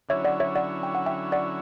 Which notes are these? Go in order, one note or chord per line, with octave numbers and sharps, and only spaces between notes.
D3 F#3 C#4 E4 C#5 E5
D5 F#5
C#5 E5
D5 F#5
G5
F#5
E5 G5
D5 F#5